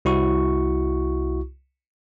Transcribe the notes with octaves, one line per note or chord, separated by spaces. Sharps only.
C2 E4 F#4 C#6